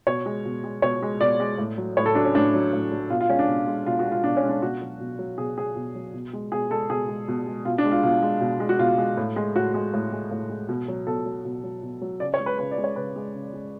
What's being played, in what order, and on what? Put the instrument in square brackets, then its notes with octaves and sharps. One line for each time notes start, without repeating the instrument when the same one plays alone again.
[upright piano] B2 C#5
G#3
B2
G#3
B2 C#5
G#3
B2 D5
G#3
A2
F#3
A2 C#5
A4
F#3 D4
C#4
A2 D4
F#3
A2
F#3
B2 F4
F4
G#3 C#4
D4
B2
G#3
B2 F4
F#4
G#3
F4
B2 D4
C#4
G#3
D4
B2 F#4
F#3
B2
F#3
B2 G#4
F#3 G#4
B2
F#3
B2
G#3
B2 G#4
G#3 A4
B2 G#4
G#3
B2
G#3
B2 F4
D4
G#3
F4
B2 F4
G#3
B2
G#3
F#4
B2 F4
G#3
A2
G#3
A2 F#4
G#3
A2
G#3
A2
G#3
B2
F#3
B2 A4
F#3
B2
F#3
B2
F#3
C#3 D5
C#5
G#3
B4
C#3 B4
D5
G#3
C#5
C#3 B4
G#3
C#3
G#3